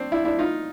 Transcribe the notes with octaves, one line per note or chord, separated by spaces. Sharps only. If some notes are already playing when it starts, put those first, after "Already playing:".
Already playing: C4 D4
D4 E4
D4 E4
D#4 F4